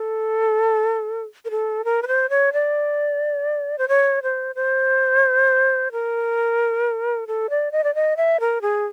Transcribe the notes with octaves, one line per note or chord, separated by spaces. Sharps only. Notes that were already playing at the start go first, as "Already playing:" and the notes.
Already playing: A4
A#4
A4
A#4
B4
C5
C#5
D5
C5
C#5
C5
C5
A#4
A4
D5
D#5
D5
D#5
E5
A#4
G#4